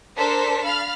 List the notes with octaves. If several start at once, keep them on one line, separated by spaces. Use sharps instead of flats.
D4 A4 A#4 C5 A5 B6
F5 B5 F6 A6